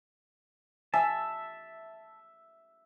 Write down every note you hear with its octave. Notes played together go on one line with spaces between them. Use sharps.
E5 G#5 A5